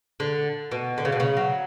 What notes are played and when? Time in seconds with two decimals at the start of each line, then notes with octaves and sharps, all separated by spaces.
0.20 D3
0.71 B2
0.98 D3
1.05 C#3
1.12 B2
1.20 C#3
1.37 F#3